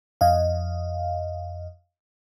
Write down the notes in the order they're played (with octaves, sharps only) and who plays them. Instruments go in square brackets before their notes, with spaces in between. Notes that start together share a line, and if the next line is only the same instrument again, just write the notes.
[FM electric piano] F2 D#5 F5